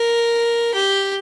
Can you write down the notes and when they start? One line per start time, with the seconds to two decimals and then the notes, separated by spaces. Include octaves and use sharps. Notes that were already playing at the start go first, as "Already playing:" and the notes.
Already playing: A#4
0.74 G4